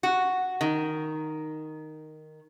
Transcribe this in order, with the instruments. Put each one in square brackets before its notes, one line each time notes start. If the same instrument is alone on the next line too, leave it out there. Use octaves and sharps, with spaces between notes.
[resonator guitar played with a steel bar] F#4
D#3